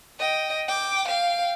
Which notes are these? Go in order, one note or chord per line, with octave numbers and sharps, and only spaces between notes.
D#5 G5
G5 D6
F5 G5